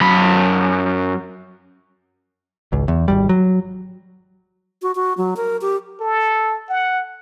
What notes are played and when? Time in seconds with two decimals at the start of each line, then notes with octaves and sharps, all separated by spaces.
0.01 F#2 B5
2.72 G#1 C#2
2.88 E2
3.08 G#1 D#2 G3
3.29 F#3
4.82 F#4
4.95 F#4
5.17 F#3
5.37 A#4
5.62 G4
6.00 A4
6.69 F#5